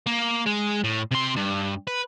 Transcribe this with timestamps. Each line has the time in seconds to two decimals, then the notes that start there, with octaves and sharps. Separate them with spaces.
0.07 A#3
0.46 G#3
0.84 A2
1.11 C3 C6
1.36 G2
1.87 B4